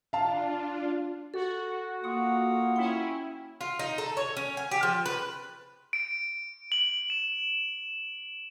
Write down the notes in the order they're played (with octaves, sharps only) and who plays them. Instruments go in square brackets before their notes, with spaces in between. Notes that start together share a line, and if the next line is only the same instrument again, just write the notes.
[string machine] D4 F4 [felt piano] F5 A5
[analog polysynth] F#4 [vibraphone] A4
[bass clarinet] A#3 [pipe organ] F4 F#5 D#6
[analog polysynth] C#4 E4 [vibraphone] G5
[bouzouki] F4
D#4
A4
C#5
C#4
G#5
G4
F3
B4
[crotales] D7
F#7
E7